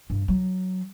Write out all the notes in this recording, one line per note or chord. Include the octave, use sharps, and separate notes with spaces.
G2
F#3